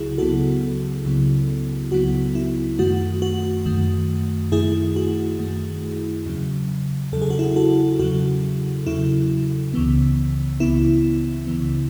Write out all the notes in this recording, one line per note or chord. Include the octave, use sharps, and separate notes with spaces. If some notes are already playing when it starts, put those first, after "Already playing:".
Already playing: C#2 C#3 F#3 E4 F#4 G#4
C#2 C#3 F#3 B3 F#4 A4
C#2 C#3 F#3 B3
C#2 C#3 F#3 B3 F#4
E4
F#2 D#3 A3 F#4
F#4
F#2 D#3 A3
F#2 D#3 A3 E4 G#4
F#4
F#2 D#3 A3
E2 C#3 F#3
E2 C#3 F#3 A4
G#4
F#4
E4 G#4
F#4 A4
E2 C#3 F#3 F#4
E2 C#3 F#3 E4
C#2 C#3 E3 B3
C#2 C#3 E3 B3 E4
C#2 C#3 E3 B3